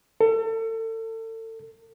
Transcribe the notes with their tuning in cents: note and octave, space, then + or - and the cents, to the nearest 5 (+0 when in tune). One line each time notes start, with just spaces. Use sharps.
A4 +35